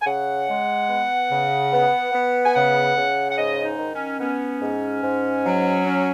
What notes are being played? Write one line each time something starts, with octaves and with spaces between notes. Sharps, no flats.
G#5
C#3 F#5
G#3
B3
C#3
B3
B3
G#5
C#3 F#5
C#3
F#5
G#2 D#5
D#4
D#3
C#4
B3 C#4
G#2
G#2
F#3
C#4